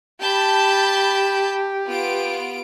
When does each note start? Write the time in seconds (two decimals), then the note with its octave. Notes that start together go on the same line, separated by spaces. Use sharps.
0.22 G4 A5 B5 G6
1.89 B3 F4 D7